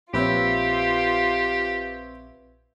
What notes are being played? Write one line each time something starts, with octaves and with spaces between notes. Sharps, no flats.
A#1 C4 F4 G4 B4 C#5 E5